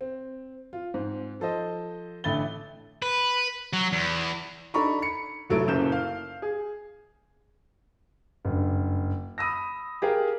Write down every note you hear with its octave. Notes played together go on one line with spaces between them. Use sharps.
C4
F4
G#2 C4
F3 A4 C5 D#5
A1 D3 A3 B5 A6 G7
B4
F#3
E2
D4 D#4 A4 A#5 B5 C#6
B5 C#7
F1 F#3 A3 E4 D7
F#1 F#2 A#2 G6 E7
F5
G#4
F#1 G2
B5 D#6 E6 A#6
G4 G#4 A#4 F5